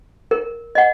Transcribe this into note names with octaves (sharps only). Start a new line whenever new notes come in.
A#4
D#5 F#5